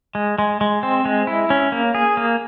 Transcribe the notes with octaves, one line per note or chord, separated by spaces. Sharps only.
G#3
G#3
G#3
C4
G#3
E4
C#4
A#3
G#4
A#3